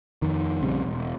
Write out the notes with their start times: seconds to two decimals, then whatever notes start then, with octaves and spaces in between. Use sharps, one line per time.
0.22 F2 D#3
0.62 A#1 C#3 G3 C4
0.84 E1